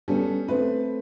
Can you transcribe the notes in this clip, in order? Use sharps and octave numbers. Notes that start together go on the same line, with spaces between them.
G3 B3 C#4 A4
A3 C4 B4